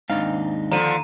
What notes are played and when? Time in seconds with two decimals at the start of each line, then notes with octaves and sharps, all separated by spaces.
0.10 D#2 G#2 C4 D4 D#4 F5
0.72 D3 F3 A#5 D#7